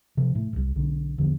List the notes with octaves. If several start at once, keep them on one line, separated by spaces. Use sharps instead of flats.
C3 F3
A2
D#1 C2
B1 D3
E2 D3 F3